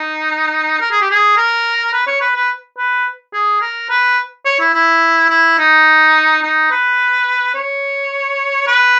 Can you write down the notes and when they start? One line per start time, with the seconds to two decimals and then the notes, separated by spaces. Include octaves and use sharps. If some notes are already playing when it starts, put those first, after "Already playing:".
Already playing: D#4
0.80 A#4
0.91 G#4
1.01 G4
1.11 G#4
1.37 A#4
1.93 B4
2.07 C#5
2.21 B4
2.36 B4
2.78 B4
3.33 G#4
3.61 A#4
3.90 B4
4.45 C#5
4.60 E4
4.74 E4
5.30 E4
5.58 D#4
6.42 D#4
6.71 B4
7.55 C#5
8.67 B4